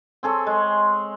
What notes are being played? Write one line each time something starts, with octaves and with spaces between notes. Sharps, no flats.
C4 G#4 A4 C#5
G#3